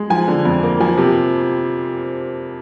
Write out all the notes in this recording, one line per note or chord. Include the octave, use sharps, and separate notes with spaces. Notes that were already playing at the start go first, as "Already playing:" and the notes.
Already playing: G#3
F3 G#5
D3
F2
A#3
F3 G#5
C3